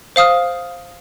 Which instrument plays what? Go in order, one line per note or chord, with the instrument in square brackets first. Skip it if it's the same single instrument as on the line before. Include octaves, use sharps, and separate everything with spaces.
[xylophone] C5 F5 D#6 F6